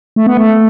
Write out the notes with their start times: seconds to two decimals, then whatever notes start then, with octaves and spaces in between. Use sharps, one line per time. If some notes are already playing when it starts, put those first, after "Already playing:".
0.16 A3
0.27 B3
0.37 A3